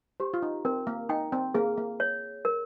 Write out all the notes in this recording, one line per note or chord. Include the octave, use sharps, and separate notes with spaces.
G4 C5
F4
D#4
C4 A#4
A#3
D#4 G5
C4
A#3 G#4
A#3
C#5
A#4